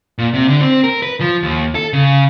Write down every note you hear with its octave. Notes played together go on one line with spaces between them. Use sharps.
A#2
C3
D3
C4
A#4
B4
F3
D#2
A4
C#3